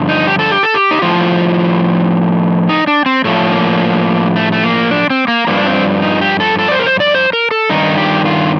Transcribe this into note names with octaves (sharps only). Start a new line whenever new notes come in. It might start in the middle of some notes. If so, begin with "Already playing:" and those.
Already playing: G2 D3 F3
D#4
G4
A4
G4
A4
G4
D#4
A2 F3 F4
D#4
D4
C4
A2 F3 A3
A#3
A3
A3
A#3
D4
C4
A#3
G2 F3 A#3
D4
C4
D#4
G4
A4
A4
D5
C5
A#4
C5
D5
C5
A#4
A4
G2 D#3 D#4
G4
F4